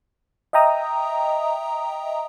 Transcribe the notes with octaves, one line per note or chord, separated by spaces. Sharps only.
D#5 E5 G5 A#5 D#6